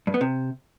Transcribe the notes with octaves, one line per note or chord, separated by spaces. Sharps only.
G2
B3
C3